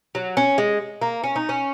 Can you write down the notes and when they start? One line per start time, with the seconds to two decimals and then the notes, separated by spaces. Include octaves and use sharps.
0.15 F#3
0.37 C#4
0.58 G#3
1.01 A#3
1.24 C#4
1.36 D#4
1.49 C#4